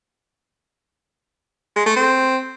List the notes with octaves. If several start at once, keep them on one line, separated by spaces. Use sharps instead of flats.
G#3
A3
C4